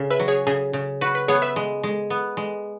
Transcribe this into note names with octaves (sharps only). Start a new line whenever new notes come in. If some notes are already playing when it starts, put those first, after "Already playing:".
Already playing: C#3
B4 E5
F#3
G#4 C#5
C#3 G#4
C#3
F#4 B4
B4
B3 G#4 C#5
B4 E5
G#3
G#3
B3
G#3